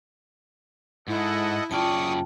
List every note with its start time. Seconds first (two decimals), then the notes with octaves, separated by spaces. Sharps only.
1.08 G#2 E4 A4 D#5 F#5
1.71 F#2 C#3 F4 D5 G5 A5 C#6 D#6